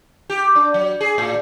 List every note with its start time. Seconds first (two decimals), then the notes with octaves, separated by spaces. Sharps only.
0.30 G4
0.55 D4
0.74 F#3
1.01 G#4
1.18 A2